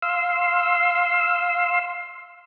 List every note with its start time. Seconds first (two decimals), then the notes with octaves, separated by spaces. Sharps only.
0.02 F5 C6 E6